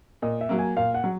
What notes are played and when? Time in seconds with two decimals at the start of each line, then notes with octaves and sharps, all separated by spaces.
0.22 A#2 D#5
0.41 E5
0.49 F#3 A#3
0.59 G#5
0.76 A#2 F5
0.94 F#5
1.04 F#3